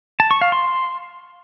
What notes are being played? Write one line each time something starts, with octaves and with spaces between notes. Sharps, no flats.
A5
C#6
F5
C6